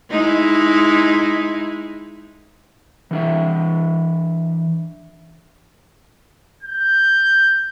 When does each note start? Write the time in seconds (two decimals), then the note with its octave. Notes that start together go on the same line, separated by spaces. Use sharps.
0.11 G#3 D#4 E4
3.11 E3 D4 E5
6.63 G6